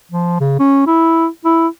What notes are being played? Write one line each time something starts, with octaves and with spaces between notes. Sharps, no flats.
F3
C#3
C#4
E4
E4